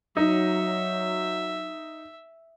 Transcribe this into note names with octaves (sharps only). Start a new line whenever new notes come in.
F#3 D#4 E5